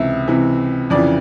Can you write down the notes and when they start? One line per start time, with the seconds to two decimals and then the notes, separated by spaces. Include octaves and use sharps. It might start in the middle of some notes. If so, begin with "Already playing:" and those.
Already playing: C#2 C3 E3 E5
0.28 C#2 C3 E3
0.90 F2 C#3 E3 D5